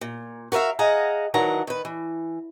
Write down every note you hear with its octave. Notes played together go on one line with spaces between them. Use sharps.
A#2
F#4 A#4 B4 E5 F5
G#4 D#5 F5 F#5 A#5
D#3 E3 F#3 D4 F#5 A#5
D#3 B4
E3